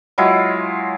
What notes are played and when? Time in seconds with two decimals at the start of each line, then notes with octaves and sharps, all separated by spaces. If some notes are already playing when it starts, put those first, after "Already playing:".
0.18 F#3 G#3 E4 F4